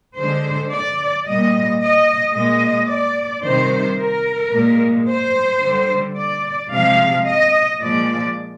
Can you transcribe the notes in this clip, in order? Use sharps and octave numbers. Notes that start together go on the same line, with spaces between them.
D3 G#3 C5
D5
A#2 G3 D#5
D#5
A#2 G#3 D#5
D5
C3 D#3 G3 C5
A#4
A#2 G#3
C5
D3 G3
D5
C3 F3 G#3 F5
D#5
A#2 F3 G#3 D5